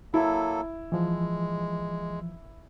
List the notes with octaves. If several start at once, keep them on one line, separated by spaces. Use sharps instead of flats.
F#3 A#3 E4 A4
E3 F3 G#3